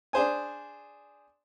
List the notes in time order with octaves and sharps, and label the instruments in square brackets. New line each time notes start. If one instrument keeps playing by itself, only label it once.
[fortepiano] D4 G#4 C5 G#5